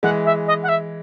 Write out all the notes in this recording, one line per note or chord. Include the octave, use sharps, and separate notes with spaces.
E3 G#3 F#5
E5
D#5
F#5
E5